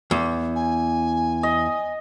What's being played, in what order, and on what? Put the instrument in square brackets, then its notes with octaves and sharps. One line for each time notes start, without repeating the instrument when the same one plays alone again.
[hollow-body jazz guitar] E2
[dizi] G#5
[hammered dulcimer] D#5